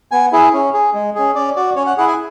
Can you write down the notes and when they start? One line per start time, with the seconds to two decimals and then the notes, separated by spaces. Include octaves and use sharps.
0.11 B3 G#5
0.33 E4 G#4
0.53 C#4
0.74 G#4
0.94 G#3
1.15 C#4 G#4
1.35 C#4 D5
1.56 F#4 D5
1.76 C#4 C#5
1.86 F#5
1.97 E4 G#4 F#5
2.08 G#5